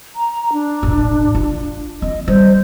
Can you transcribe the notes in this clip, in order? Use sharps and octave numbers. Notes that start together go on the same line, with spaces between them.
A#5
D4
E1 A1
F4
C4 D#5
G3 C5